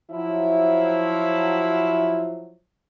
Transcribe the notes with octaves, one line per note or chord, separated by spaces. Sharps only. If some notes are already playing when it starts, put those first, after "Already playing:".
F3 F#3 E4